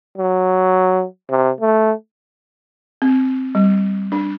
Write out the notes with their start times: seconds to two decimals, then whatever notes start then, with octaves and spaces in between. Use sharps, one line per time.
0.18 F#3
1.30 C3
1.61 A3
3.02 C4
3.55 G3
4.12 D4